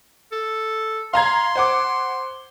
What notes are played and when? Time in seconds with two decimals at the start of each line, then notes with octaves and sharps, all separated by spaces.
0.32 A4
1.13 F5 A#5 C6 G#6
1.55 C5 F#5 D6